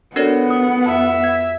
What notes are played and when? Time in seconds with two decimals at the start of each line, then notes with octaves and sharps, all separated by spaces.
0.16 B3 D4 F#4 A4 A#4 C#5 D5 F#5
0.50 D#6
0.86 F2 E5
1.24 G#6